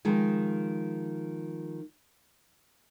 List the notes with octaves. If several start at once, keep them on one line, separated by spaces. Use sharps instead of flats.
D#3 F3 G#3